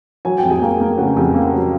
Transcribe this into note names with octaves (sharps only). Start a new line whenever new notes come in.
F#3 G#5
F2 G5
G#4 G#5
A#3
A#3
C#3 F#5
F2 G4 G5
A#3
F#3